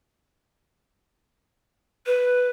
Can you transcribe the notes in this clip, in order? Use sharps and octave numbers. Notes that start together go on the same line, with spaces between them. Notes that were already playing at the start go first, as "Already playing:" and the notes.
B4